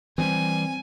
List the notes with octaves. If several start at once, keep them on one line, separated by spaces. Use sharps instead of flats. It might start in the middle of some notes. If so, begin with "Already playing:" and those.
E3 F#3 G3 C4 G#5